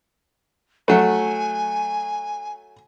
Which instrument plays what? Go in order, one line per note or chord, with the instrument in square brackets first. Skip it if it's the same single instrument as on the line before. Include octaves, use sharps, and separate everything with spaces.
[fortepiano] F#3 A3 [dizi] G#5